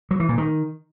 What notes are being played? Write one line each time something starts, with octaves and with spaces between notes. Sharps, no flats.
F#3
E3
A#2
D#3